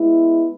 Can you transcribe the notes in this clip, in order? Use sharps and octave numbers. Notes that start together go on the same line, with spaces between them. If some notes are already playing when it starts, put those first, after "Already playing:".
Already playing: G#3 B3 E4